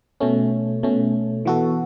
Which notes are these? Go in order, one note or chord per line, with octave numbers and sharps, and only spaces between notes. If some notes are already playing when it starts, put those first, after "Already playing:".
B2 A3 C#4
B2 A3 C#4
E3 B3 F#4 A4